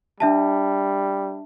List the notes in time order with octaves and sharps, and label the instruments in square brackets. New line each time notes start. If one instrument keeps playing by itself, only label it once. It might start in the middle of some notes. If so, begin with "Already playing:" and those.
[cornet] G3 [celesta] D4 E5 A5